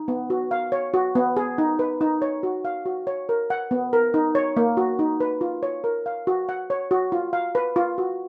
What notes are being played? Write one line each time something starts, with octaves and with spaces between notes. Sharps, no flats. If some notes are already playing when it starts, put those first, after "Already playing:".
Already playing: D#4
B3
F#4
F5
C#5
F#4
B3
G#4
D#4
B4
D#4
C#5
F#4
F5
F#4
C#5
A#4
F#5
B3
A#4
D#4
C#5
A#3
F#4
D#4
B4
F4
C#5
A#4
F5
F#4
F#5
C#5
F#4
F4
F5
B4
F4
F#4